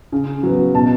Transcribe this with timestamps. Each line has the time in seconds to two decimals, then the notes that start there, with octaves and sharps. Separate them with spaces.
0.12 C#3
0.43 F#3 B3
0.75 B2 A5